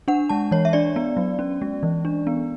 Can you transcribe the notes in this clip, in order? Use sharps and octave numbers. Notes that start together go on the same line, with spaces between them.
D4 F#5
G#3 A5
E3 C#5
E5
D4 D5
B3
F#3
C#4
G#3
E3
D4
B3